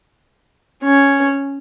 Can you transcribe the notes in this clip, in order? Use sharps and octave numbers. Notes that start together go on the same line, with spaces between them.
C#4